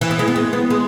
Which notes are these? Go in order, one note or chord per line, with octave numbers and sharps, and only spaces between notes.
E3
B3
G#3
B3
G#3
B3
G#3